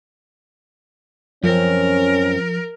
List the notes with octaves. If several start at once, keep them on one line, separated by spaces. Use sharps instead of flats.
F#2 F3 C4 C#4 A#4